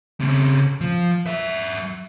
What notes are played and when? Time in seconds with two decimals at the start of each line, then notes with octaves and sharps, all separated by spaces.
0.20 C#3 C4
0.81 F3
1.27 F#3 E5